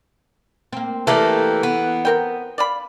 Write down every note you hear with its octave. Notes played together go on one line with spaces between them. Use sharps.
A#3 C4
E3 A3 A#3 G4 A4 D5
B3
C4 A#4 G5
D5 F5 B5